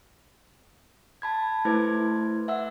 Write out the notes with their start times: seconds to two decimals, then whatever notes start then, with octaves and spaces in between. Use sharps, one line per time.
1.22 A5 B5 G#6
1.65 A3 E4 B4 C5 G#6
2.48 E5 F#5 E6